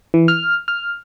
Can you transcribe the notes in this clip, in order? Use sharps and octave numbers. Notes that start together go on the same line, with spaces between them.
E3
F6
F6